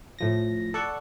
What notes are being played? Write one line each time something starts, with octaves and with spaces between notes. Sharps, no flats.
A2 F3 A#6
A4 D5 F#5 C#6